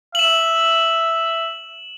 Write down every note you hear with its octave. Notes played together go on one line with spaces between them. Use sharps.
E5 E7 F#7